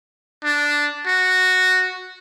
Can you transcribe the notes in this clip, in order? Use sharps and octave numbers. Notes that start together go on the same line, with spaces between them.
D4
F#4